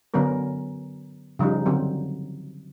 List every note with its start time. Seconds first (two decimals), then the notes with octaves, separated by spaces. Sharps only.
0.14 D3 F#3 B3 C#4 A#4
1.39 C#3 F3 G3 D#4
1.66 D3 F#3 C4